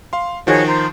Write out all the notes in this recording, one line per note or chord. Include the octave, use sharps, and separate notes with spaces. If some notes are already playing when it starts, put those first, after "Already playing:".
F5 C6
D#3 F3 F#4 G#4 C#5
C5 A#5